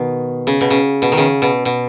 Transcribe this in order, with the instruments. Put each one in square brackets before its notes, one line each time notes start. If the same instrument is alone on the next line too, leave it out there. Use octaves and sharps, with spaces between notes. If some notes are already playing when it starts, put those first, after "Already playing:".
Already playing: [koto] B2 D#3
C#3
B2
C#3
B2
D#3
C#3
B2
B2